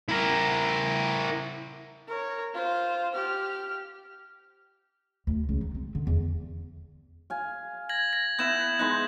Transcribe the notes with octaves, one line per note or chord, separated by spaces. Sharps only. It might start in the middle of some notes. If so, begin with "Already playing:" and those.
E4 A#4
A#4 C#5
F4 C5
G4 F6
D2
C#2
D#3
C4
D3
E2
F5 G#5
G#6 A#6 F#7
A#6
B3 E4 G6 E7 F#7
G#3 B3 D#4 F#6